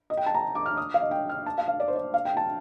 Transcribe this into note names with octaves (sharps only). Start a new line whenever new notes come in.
D#5
G5
A5
A#5
D6
F6
D#6
F5
D#5
G5
F6
A5
F5
F5
D5
C5
D5
F5
G5
A5